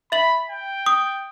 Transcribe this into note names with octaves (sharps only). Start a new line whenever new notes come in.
E5 B5 F#7
G5
D#6